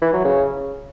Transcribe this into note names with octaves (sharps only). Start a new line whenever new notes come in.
E3
F#3
C#3